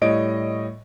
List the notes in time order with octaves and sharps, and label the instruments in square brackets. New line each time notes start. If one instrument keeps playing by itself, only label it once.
[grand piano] A2 G3 C#5 D#5 D7